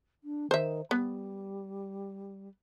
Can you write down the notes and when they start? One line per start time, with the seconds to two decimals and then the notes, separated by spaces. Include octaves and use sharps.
0.24 D4
0.51 D#3 C5 E5
0.91 G3 B3